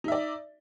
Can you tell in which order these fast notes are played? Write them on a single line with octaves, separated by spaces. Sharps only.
D#4 E5 D5